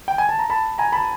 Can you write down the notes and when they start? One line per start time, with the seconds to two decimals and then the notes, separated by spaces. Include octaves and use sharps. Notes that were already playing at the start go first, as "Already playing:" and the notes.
0.08 G5
0.18 G#5
0.29 A5
0.39 A#5
0.50 A5 B5
0.78 G#5 A#5
0.92 A5 B5